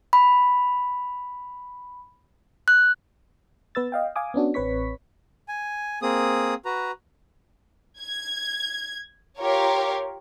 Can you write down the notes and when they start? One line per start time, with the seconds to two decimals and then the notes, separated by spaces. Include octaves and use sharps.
0.13 B5
2.68 F#6
3.75 B3 B4 E6 A6
3.92 D#5 F5 G5
4.16 F5 G#5 D6 D#6
4.34 B3 C#4 D4 F#4
4.54 A1 C4 B4 C#5 C#6 B6
5.48 G#5
6.02 A#3 C4 G#4 D#6
6.65 F#4 B4 A#5
8.00 G#6
9.40 F4 G4 A#4 C#5